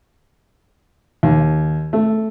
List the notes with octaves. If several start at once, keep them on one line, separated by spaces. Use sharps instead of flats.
D#2
A3